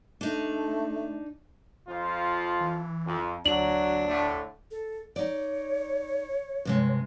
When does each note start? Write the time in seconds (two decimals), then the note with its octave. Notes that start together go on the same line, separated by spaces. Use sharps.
0.21 A3 D4 D#4
1.87 F2 F3 F4
2.61 E3
3.05 F2
3.46 D2 F#3 D4 F#7
4.07 A2 D3 A3
4.71 A4
5.16 D#4 C#5 D5
6.65 G2 C3 G#3